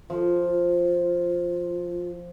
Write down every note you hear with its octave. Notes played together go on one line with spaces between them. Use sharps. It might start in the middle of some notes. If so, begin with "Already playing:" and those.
F3 F4